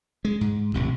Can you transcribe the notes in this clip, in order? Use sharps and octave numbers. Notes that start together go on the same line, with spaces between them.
G#3
G#2
D#1 A1 C3